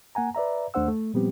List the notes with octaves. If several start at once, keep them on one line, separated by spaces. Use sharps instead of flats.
A#3 F#5 G#5 A#5
B4 D5 E5 A#5
D#2 A3 D4 C5 F#5 E6
A3
A#2 F3 G3 B3 C4 G4